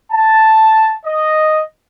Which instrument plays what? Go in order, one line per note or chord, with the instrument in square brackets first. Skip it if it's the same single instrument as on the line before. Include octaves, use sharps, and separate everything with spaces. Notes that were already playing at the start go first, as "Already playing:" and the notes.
[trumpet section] A5
D#5